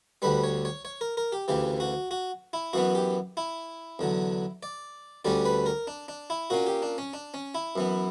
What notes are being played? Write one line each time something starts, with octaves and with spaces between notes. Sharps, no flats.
D2 D3 G3 B4
C#5
C#5
C#5
A#4
A#4
G4
D2 C#3 E3 G4
F#4
F#4
E4
F#2 E3 B3 F#4
G4
E4
E2 D3 F#3
D5
D2 D3 G3 C#4 D5
B4
A#4
D4
D4
E4
A#2 A#3 C#4 F#4
G4
D4
C#4
D4
C#4
E4
F#2 E3 B3